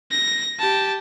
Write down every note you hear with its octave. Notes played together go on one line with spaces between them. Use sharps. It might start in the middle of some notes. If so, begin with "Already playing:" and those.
A#6
G4 A5